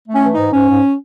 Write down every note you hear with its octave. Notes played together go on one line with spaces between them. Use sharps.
A3 C#4
E3
G#2 D#4
G#2 C#4
G#2